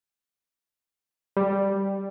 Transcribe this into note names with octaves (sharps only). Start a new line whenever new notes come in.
G3